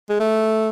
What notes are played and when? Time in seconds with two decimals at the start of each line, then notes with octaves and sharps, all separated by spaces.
0.10 G#3
0.20 A3